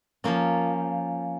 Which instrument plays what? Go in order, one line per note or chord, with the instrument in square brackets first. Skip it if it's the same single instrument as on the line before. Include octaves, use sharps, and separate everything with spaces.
[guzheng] F3 A#3 C#4